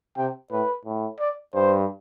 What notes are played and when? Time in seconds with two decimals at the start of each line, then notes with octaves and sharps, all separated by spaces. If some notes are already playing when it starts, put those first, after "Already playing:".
0.17 C3 G5
0.51 A2 B4
0.85 A2
1.20 D5
1.54 G2 C5